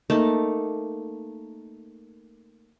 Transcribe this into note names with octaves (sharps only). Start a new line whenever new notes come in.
A3 A#3 D#4 A5